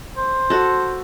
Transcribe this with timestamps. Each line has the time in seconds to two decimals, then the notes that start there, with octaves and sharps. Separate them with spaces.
0.17 C5
0.50 F#4 A4